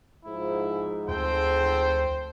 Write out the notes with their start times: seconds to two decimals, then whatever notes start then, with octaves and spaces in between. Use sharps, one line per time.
0.25 G#2 F3 E4
1.09 D2 C4 A4 C5 G5